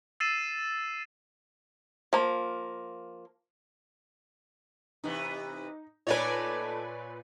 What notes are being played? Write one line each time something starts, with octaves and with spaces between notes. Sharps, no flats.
E6 A6 C7 D#7 E7
F3 A#3
C3 E3 B3 D#4
A#2 A3 D#4 B4 C#5 D5 G#5